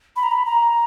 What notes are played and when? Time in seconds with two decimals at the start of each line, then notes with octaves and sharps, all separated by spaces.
0.16 B5
0.23 A#5
0.31 B5
0.46 A#5